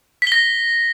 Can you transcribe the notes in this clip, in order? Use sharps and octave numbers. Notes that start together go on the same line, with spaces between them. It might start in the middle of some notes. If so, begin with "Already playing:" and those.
A#6 B6 G7